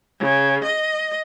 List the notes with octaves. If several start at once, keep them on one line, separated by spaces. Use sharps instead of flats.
C#3
D#5